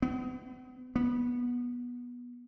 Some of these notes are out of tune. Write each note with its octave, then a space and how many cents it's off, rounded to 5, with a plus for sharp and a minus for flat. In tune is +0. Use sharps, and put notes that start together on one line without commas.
B3 +35
B3 -15